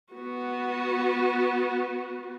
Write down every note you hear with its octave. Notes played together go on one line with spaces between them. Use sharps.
B3 F#4